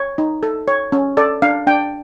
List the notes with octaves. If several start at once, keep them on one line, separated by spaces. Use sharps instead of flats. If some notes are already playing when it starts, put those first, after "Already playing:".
Already playing: C#5
D#4
A4
C#5
C#4
A4 D5
D4 F5
D4 G5